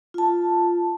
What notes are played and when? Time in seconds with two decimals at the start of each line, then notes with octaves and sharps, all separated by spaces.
0.14 F4 A5